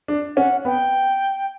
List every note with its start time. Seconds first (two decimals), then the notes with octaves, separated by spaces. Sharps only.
0.08 D4
0.37 C#4 F#5
0.65 B3 G5